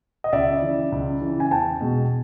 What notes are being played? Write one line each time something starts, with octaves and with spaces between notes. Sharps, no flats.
D#5
C#2 D5 E5
C#3 E3
C#2
C#3 E3
G#5
E2 G5 A5
B2 G#3